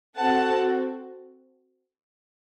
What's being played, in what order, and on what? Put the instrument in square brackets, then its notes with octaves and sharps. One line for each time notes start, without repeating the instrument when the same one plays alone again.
[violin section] C4 F#4 A4 F#5 A5